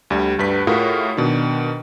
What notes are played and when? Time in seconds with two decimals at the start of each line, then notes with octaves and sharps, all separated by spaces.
0.10 D2 G3
0.39 D2 G2 B4 B6
0.67 A2 F4 F#4 G#4 A#4
1.17 B2 D#3 D4